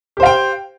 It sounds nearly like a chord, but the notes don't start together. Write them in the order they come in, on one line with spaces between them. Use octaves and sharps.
G4 C5 F5 G5